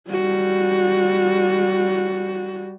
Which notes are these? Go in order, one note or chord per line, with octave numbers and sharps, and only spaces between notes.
G3 F#4